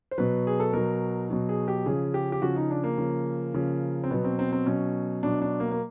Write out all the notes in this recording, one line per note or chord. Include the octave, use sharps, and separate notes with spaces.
C5
B2 F#3 B4
G#4
A4
B2 F#3 A#4
B2 F#3
G#4
G4
C#3 F3 G#4
G4
G4
C#3 F3 F#4
D#4
D4
A#3
C#3 F3
C#3 F3
C4
B2 F#3 B3
C4
C4
C4
B2 F#3 C#4
B2 F#3 D4
D4
A#3
A#3